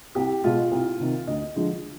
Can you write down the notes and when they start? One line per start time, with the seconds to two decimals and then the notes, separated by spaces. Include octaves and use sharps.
0.15 C2 G4
0.44 B2 G#3 F4
0.71 C2
1.00 C3 D#3
1.27 D2 D#5
1.56 D3 F3 G#3